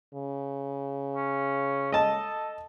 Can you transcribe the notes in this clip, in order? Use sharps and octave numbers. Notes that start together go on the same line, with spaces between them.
C#3
C#4
A4 D#5 A5